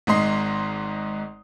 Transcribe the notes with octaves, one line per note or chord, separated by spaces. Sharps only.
G#1 G#2 D#5 C6 C7